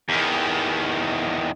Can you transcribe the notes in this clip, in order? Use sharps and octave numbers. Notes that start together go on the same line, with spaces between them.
E2 D#3